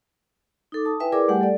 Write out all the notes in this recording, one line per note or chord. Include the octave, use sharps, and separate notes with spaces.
D#4 A4 D6
A5 D#6
E4 B4 E5 G5 G#5
E4 G#4 A#4 B4 D5 D6
G3 A3 G4 F#5 G#5
A4 D5